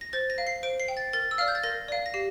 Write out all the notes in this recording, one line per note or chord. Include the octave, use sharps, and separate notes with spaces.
A#6
C5 A6
A#6
F5
C7
C5 D7
C7
G5
A6
A#4 A6
E6
D5 F5 F6
G6
A6
A#4 A#6
D5 F5
A#6
G4 C7